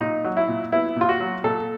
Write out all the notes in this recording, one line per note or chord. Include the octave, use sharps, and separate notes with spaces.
A#2 D#4
F#3
E4
A#2
B3 E4
A#2 F4
F#4
F#3
A#2 A4